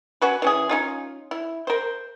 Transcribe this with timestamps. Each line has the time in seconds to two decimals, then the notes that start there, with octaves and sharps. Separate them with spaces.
0.22 C#4 F#4 B4
0.42 E3 C#4 G#4
0.69 C#4 D#4 F4
1.31 E4
1.67 A#4 C5